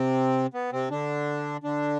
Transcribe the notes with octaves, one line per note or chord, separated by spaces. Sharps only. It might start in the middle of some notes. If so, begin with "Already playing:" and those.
Already playing: C3 C4
B3
C3 C4
D3 D4
D3 D4